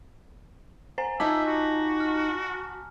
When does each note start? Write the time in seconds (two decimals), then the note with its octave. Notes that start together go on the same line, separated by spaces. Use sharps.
0.98 C5 G#5 A#5 C7
1.20 D#4 F4 D#5 E5 A5 D6 B6
1.45 F#4
2.00 F6